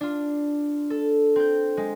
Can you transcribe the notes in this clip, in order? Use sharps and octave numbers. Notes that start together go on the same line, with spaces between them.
D4 F4
A4
C4 G6
G#3